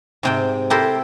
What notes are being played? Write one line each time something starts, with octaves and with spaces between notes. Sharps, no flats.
G#2 C3 G5
E4 G4 A4 A#4 C5